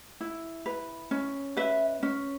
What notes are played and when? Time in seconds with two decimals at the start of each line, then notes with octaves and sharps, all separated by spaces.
0.21 E4
0.66 B4
1.11 C#4
1.57 B4 E5
2.03 C#4